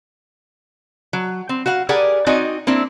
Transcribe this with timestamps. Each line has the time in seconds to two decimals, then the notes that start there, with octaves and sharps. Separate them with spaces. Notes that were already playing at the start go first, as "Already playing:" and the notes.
1.13 F#3
1.49 C4
1.66 F#4 F5 F#5
1.89 G4 G#4 A#4 D5 F#5 G#5
2.26 C4 D#4 F#4 D5 D#5 G#5
2.67 A#3 C4 D4 E4